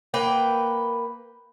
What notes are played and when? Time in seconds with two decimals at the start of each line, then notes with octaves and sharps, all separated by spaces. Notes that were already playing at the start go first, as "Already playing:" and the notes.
0.14 A#3 B4 G5